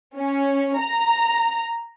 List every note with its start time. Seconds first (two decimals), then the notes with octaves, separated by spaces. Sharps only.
0.16 C#4
0.77 A#5